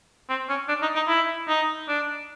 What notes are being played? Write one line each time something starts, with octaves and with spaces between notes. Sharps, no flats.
C4
C#4
D4
D#4
D#4
E4
D#4
D4